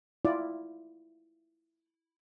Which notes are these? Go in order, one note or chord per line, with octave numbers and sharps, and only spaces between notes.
E4 F4 D5